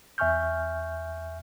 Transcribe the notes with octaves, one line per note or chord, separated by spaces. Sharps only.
E2 E5 G#5 C#6 F6 G6